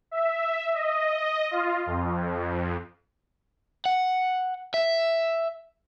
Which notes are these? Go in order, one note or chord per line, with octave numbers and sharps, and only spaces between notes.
E5
D#5
F4
F2
F#5
E5